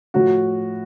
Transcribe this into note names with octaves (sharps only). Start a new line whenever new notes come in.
A2 F3 F#4